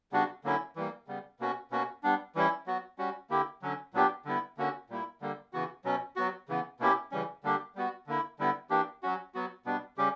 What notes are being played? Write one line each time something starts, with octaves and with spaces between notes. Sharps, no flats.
C#3 G3 B3 D4 F#4
D3 F#3 A#3 C#4 E4
E3 G3 A#3
C#3 G3 B3
B2 A#3 C#4 F#4
B2 A#3 C#4 F#4
G3 B3 D4
E3 G3 C#4 E4
F#3 B3 F#4
G3 C#4 F#4
D3 A#3 E4 G4
D3 F#3 C#4
A#2 F#3 B3 D4 G4
D3 G3 B3 E4
D3 A#3 C#4 F#4
A#2 G3 A#3 E4
D3 G3 A#3
C#3 E3 B3 F#4
B2 F#3 C#4
F#3 B3 F#4
C#3 E3 B3
B2 A#3 C#4 E4 G4
C#3 E3 G3 C#4
D3 G3 A#3 D4 G4
G3 B3 F#4
D3 A#3 E4
D3 G3 B3 E4
E3 A#3 D4 G4
F#3 C#4 F#4
F#3 B3 F#4
B2 G3 B3 D4
C#3 G3 C#4 G4